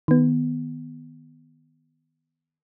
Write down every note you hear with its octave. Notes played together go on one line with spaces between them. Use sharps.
D#3 B3